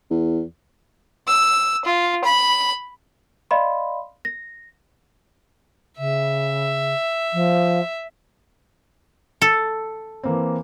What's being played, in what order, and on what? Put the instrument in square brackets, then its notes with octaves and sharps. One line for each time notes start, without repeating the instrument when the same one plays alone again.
[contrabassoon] E2
[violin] E6
F4
B5
[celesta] D5 D#5 F5 B5 C6
A#6
[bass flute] C#3 [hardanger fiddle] E5
[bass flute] F3
[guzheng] A4
[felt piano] E3 A#3 C4